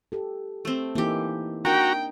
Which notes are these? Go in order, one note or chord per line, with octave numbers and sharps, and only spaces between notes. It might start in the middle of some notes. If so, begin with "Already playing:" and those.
G4 A4
A3 C4
E3 A#3 D#4 G4
D4 D#4 F#4 A#4 G5 A#5